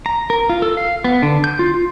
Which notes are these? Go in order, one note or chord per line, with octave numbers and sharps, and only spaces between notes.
A#5
A#4
F4
A4
F5
B3
D3
G6
F4
F4